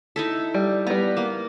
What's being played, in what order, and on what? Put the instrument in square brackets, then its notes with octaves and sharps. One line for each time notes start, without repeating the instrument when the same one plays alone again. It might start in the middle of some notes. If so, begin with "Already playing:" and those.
[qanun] D#4 E4 A4
[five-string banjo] G3
[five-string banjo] G3 B3 [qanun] A#5
[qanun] A#3